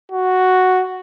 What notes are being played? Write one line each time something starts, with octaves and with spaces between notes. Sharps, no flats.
F#4